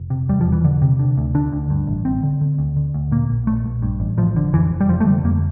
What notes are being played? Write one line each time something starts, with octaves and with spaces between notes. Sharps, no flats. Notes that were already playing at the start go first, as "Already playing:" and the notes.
Already playing: F1
C3
E2 G3
F3
E1
E3
E1 D3
C3
D3
D2
D3 D4
D2
G2
A1
A1 C4
D3
D3
D2
D3
D2
A#2 A#3
A#1
A#2 A3
A#1
G2
A1
A1 F3
D3
F2 E3
F1
G3
F1 F3
A3
D3 G3
F2 A#3